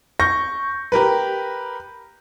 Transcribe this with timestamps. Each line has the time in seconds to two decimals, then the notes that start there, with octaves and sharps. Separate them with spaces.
0.20 C#6 G6 A#6
0.92 G4 A#4 B4